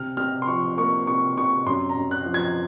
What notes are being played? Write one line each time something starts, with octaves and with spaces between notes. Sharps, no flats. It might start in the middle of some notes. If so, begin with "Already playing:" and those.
Already playing: C3 F6
C3 F6
C6
F3 C#6
A#3 C#6
C3 C#6
C3 C#6
F#2 C6
A#5
F#2
F#6
F3
G#6